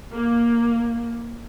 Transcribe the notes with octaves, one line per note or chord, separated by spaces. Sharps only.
A#3